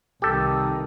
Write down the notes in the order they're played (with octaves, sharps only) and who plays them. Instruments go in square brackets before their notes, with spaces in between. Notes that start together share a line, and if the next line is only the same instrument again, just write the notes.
[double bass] C2 D#3 [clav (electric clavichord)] G4 A4